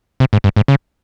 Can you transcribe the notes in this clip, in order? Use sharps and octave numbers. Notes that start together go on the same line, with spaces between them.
C3
G#2
G2
G#2
C#3